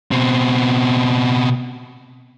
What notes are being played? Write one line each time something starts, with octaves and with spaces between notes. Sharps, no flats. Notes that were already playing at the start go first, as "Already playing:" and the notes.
B2 C4